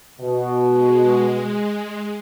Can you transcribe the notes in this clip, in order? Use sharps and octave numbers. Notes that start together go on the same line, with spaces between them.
B2
G#3